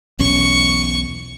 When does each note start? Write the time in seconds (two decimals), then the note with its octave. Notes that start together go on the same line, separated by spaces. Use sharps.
0.19 B1 E2 C#4 C#6